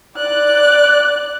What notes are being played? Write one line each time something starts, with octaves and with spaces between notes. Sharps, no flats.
D5 F#6